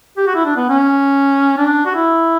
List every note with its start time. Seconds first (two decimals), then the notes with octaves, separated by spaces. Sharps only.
0.17 G4
0.27 F#4
0.35 E4
0.45 D4
0.56 B3
0.70 C#4
1.58 D4
1.86 F#4
1.95 E4